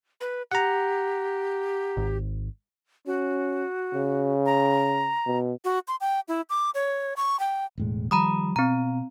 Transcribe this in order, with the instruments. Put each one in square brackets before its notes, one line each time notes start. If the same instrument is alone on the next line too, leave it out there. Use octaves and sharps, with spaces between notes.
[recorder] B4
[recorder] G4 [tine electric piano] F#5 A#5
[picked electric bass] G#1
[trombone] C#4 [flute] F#4
[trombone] C#3
[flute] A#5
[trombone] B2
[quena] F#4
C6
G5
E4
D6
C#5
C#6
G5
[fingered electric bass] E1 A2 G#3
[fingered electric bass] D#3 F3 G3 [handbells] A#5 B5 D#6
[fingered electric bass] B2 [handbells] C4 A#5